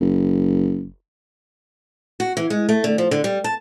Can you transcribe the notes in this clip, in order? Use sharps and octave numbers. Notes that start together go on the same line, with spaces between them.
F#1
F#4
E3
G#3
A3
D3
F3
D3
G3
A5